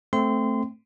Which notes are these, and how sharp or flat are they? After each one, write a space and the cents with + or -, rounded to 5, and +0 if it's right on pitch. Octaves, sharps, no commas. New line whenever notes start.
A3 +0 C4 +0 C6 -25